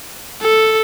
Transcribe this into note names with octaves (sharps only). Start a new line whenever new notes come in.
A4